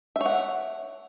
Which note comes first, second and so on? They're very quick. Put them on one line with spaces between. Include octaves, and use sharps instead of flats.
E5 C#5 F#5